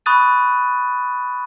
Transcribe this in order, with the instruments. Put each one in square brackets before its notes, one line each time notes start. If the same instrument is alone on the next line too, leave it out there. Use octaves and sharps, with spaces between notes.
[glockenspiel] B5 C#6 D#6 F#6 A6 D#7